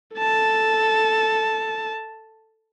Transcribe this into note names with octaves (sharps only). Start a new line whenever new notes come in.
A4 A5